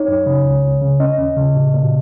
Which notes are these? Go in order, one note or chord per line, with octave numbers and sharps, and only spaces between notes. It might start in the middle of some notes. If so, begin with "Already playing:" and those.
Already playing: D#4 C#5
F#2
C#3
C#2
C#2
C#3
C#4 D#5
D#2
C#3
A#2
A#2